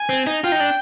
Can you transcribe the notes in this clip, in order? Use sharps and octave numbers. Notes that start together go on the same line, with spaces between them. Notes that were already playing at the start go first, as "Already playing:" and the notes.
Already playing: G#5
C4
D#4
F4 G5
D#4
D4